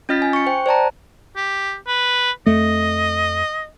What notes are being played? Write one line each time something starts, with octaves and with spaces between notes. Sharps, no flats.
C#4 F4 D#5 F6 A6 B6
G#5
C#6 C#7
C5 G5
C5 D5 A5 A#5
G4
B4
F2 A3 D#5